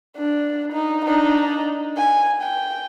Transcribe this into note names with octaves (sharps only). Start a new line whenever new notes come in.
D4
D#4
D4 D#4
G#5
G5